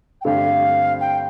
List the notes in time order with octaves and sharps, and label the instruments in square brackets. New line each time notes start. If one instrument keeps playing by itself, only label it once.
[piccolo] G5
[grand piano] G2 D3 A3 C4 G4 [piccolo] F5
[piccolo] G5